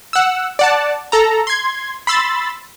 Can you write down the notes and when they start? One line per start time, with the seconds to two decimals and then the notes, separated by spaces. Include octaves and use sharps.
0.13 F#5 E6
0.59 D5 F#5 A5
1.12 A4 A#5
1.47 C6 G#6
2.07 B5 C6 E6 A6